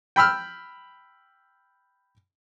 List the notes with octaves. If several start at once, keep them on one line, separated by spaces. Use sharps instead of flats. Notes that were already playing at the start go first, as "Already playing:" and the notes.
G5 B5 E6 F6